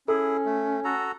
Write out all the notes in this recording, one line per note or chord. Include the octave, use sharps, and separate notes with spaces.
C#4 E4 G#4 A4
A3
F#4 A4 A#5